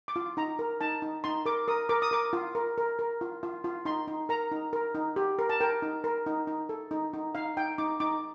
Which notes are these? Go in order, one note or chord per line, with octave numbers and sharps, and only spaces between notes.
D6
F4
D#4 A#5
A#4
D#4 A5
D#4
D#4 C6
A#4 D6
A#4 D#6
A#4 D6
D#6
A#4 D6
F4
A#4
A#4
A#4
F4
F4
F4
D#4 C6
D#4
A#4 A#5
D#4
A#4
D#4
G4
A#4
A5
A#4 G5
D#4
A#4
D#4
D#4
A4
D#4
D#4
D#4 F5
D#4 G5
D#4 D6
D#4 D6